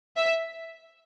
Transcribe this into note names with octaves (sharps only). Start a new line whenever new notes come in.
E5